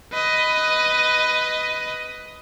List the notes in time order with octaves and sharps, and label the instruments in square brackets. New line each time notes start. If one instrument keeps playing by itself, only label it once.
[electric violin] B4 D#5